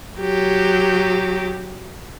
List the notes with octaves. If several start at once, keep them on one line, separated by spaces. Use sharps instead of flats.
F#3 G4